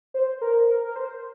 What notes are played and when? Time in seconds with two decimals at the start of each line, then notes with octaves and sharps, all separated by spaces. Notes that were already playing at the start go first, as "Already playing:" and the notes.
0.14 C5
0.41 A#4
0.68 A#4
0.85 A#4
0.96 C5